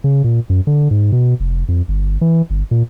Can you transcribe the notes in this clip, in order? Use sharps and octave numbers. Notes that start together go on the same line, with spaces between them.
C#3
A#2
F#2
D3
G#2
B2
F1
F2
G1
E3
G1
A#2